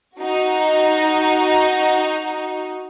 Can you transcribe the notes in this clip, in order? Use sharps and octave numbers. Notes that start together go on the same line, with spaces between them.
D#4 F#4